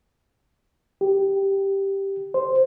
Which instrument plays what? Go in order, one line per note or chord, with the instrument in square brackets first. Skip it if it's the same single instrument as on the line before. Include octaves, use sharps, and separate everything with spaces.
[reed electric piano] G4
C5